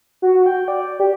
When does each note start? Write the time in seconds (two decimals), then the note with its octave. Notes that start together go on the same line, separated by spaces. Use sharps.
0.22 F#4
0.46 G5
0.68 D5
1.00 G4